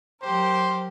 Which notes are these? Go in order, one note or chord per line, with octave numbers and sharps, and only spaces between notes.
F#3 G4 A#4 C5